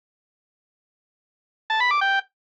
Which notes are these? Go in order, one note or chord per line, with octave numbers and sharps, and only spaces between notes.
A5
B5
D6
G5